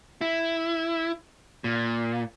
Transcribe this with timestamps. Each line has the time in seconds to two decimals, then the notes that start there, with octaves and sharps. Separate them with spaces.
0.21 E4
1.64 A#2